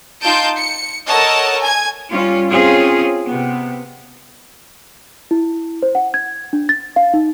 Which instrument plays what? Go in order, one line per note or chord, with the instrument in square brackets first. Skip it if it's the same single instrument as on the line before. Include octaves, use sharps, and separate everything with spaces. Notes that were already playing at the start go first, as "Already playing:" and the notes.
[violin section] D#4 F4 A5 G6 D7
C#7
A4 A#4 C#5 D#5 F#5 A5
G#5 G#6
[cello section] G3 C#4 F4
C4 C#4 F4 G#4
C3 B3
[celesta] E4
C5
F#5
G#6
D4
A6
F5
D#4